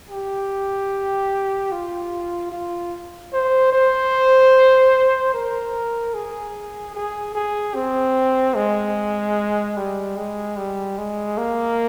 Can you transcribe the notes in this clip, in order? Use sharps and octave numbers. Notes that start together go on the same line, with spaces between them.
G4
F4
F4
C5
C5
A#4
G#4
G#4
G#4
C4
G#3
G3
G#3
G3
G#3
A#3